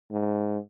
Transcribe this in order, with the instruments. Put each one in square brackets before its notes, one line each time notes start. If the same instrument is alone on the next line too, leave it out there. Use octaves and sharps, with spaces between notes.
[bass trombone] G#2